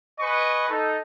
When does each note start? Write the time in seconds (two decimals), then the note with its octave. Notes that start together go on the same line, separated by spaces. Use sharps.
0.19 B4 D#5 G#5 C#6
0.69 D#4 A4